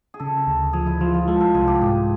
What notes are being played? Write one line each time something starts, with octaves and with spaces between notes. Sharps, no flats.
G#4
C#3 A4
D2
F3 G#4
E4
F3 F4
F4
G#3 A4
A4
C2 G#4
G4
G#2 G#4